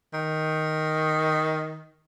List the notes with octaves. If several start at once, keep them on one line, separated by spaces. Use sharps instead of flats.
D#3